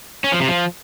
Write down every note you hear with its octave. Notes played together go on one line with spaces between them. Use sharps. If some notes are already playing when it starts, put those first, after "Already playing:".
C#4
F3
C3
F3